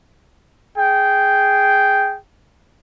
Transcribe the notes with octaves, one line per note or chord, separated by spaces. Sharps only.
G#4 G5